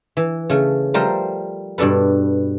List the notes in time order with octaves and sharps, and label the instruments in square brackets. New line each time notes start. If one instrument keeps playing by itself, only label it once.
[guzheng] E3
C#3 A3
F3 G3 A3 A#4 C5
G2 B2 D4 A4 B4